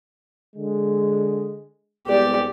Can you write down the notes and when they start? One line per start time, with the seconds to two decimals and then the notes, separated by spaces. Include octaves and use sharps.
0.56 D3 G#3
2.07 C2 G#3 B3 G4 D5